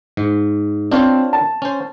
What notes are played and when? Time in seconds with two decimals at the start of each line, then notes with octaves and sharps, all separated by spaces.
0.17 G#2
0.92 C4 D4 F4 C#5
1.33 A5
1.62 C#4 C5